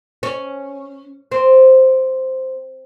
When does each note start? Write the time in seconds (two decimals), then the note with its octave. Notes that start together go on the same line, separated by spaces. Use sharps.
0.23 C#4
1.32 C4